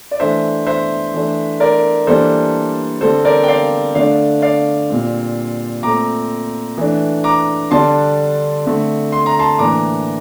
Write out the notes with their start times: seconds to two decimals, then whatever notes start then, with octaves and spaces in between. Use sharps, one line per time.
0.11 D5
0.19 E3 A3 D4 C5 E5
0.67 C5 E5
1.14 E3 A3 D4
1.60 A#4 D5
2.07 E3 G3 A#3 D4 A4 C5
3.01 D3 G3 C4 A4 C5
3.25 A#4 D5
3.43 G5
3.48 D5 F5
3.95 D3 A3 D4 D5 F5
4.42 D5 F5
4.90 A#2 G3 C4
5.83 A#2 A3 C4 A#5 D6
6.77 E3 A3 D4
7.24 A#5 D6
7.71 D3 G3 D4 A5 C6
8.65 D3 A3 C4
9.12 C6
9.26 A#5
9.39 A5 C6
9.58 A2 E3 A#3 D4 A#5 D6